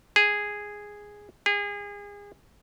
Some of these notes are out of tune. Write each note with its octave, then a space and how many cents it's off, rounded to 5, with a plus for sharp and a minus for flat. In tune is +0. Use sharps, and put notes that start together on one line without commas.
G#4 -5
G#4 -30